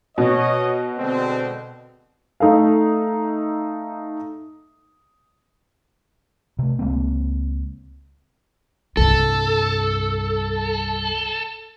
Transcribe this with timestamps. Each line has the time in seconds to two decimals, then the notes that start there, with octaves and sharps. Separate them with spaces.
0.18 B2 C#5 D#5
0.99 D3 G#3 C4
2.40 A3 D#4 A4 F5
6.59 C3 A3
6.79 C#2 G#3 A#3 C4
8.97 C2 G2 A4